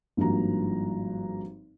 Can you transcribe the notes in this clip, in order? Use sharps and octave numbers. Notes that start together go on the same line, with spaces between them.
G#1 G2 F3 A#3 F#4 A#5